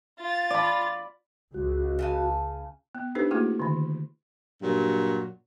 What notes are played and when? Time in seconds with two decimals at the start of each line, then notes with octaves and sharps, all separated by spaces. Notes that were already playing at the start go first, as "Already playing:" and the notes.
0.20 F4 A6
0.51 D5 B5
1.54 C#2 F#4
1.99 C#3 G#5 A5
2.95 B3
3.15 D4 D#4 G4 A4 B4 C5
3.31 A3 A#3 E4 F#4 G#4
3.60 D3 D#3
4.62 G2 A#2 F#3